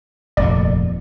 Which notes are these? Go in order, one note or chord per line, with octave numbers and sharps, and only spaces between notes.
F1 D#2 A#2 D5